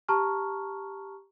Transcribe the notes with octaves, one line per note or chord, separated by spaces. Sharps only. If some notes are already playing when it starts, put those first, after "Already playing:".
G4 A5 A#5 C#6 F6